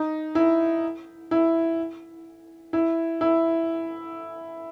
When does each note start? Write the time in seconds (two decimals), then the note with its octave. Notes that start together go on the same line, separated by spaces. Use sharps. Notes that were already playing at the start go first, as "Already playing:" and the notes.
Already playing: D#4
0.35 E4
1.31 E4
2.73 E4
3.21 E4